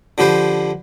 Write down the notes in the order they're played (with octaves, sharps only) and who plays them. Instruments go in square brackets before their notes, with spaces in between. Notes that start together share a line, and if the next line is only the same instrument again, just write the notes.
[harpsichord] D3 F3 G4 B4 C5